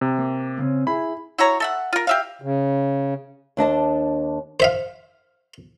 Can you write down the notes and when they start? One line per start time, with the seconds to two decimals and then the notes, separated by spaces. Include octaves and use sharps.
0.01 C3
0.19 A#3
0.59 C#3 C4 C#4
0.87 E4 G#4 B5
1.38 E4 F#4 C#5 A#5
1.60 A4 E5 F#5
1.93 F4 A#4
2.07 G4 E5 F5
2.42 C#3
3.57 D#2 D4 D#5 A5
4.60 C5 E5 F5